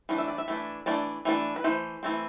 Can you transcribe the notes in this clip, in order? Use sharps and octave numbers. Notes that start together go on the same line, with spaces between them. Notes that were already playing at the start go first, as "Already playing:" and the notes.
E3 A3 D4
E5
D5
E5
E3 A3 D4
E3 A3 D4 D5
E3 A3 D4
B4
E3 A3 C5
E3 A3 C4